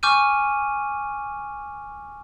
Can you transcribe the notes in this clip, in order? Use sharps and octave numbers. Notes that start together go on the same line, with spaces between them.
G#5 C#6 D6 F6 G6 D#7